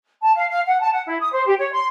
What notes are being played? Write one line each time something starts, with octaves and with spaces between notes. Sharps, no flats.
A5
F5
F5
F#5
A5
F#5
E4
D#6
C5
G4
C#5
C6